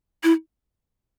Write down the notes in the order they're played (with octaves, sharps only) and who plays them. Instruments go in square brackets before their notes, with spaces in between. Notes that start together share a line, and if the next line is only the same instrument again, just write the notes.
[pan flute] E4